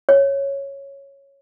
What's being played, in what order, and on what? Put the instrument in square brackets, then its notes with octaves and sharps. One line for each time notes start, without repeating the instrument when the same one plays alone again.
[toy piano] C#5